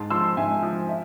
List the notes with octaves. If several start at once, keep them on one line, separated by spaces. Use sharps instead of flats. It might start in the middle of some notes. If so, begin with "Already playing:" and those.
Already playing: G#2 A5 C6
F3 C6 E6
G#2 E5 G#5
F3
E5